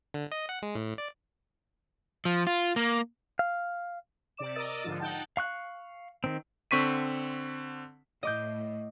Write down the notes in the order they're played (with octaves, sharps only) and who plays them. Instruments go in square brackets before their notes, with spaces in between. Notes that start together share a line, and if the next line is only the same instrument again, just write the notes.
[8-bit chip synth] D3
D#5
F#5
G#3
A2
D5
[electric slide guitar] F3
F4
A#3
[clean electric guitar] F5
[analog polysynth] C3 D5 D6 E7
A#4 D5 D#5 D#6 E6 A6
G#2 D3 F3 F4
D#4 F#5 G5 A5
[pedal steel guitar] F5 C#6 F#6
D#3 C4
[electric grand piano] D3 C4 C#6 B6 D#7
[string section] A2 [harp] D#5 D6 G6